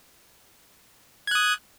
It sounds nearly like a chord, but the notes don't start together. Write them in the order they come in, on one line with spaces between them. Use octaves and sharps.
G#6 F#6 D#6